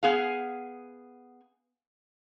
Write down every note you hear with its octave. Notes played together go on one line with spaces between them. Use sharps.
B3 G#4 F5